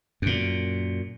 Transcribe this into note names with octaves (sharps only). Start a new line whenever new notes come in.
F#2 A#2